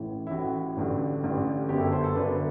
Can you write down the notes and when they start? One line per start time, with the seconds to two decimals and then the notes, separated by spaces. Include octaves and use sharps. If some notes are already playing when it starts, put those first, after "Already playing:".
Already playing: A1 A2 E3
0.27 E4
0.31 A1 A2 E3 F#4
0.77 A1 G2 D3
1.23 A1 G2 D3
1.69 G1 F#2 D3 G4
1.81 A4
1.92 C5
2.04 A4
2.15 G1 F#2 D3 B4